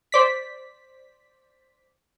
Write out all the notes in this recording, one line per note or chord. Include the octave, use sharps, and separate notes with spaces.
C5 D5 B6